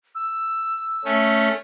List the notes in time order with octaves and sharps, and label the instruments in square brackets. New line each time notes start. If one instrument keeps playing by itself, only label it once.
[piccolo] E6
[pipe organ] A3 C#4